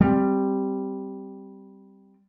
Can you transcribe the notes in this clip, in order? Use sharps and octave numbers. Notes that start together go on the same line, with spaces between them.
G3 C4